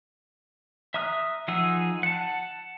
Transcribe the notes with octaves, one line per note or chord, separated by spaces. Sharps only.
E5 A#5 D#6 F6 F#6
F3 D#4 G#4 F#5 E6
F#5 A5